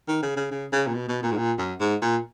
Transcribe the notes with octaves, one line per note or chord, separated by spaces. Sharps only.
D#3
C#3
C#3
C#3
C#3
A#2
B2
B2
A#2
G#2
A#2
F#2
G#2
A#2